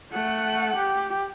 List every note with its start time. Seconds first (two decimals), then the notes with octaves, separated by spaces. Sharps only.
0.12 A3 F#5
0.77 G4